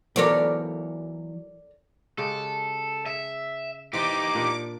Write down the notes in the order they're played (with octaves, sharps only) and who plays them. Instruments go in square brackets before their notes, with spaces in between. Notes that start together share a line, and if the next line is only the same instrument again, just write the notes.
[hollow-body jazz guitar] E3 F#3 B3 [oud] A#4 C#5 D5
[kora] C#3 G#3 G4 [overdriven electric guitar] A4
[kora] G#4 [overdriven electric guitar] E5
[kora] E3 C5 D5 [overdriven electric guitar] D#4 G4 [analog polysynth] D6
[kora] A#2 D4